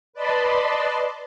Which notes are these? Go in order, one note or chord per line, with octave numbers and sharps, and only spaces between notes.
B4 D5 D#5 A5 B5 C6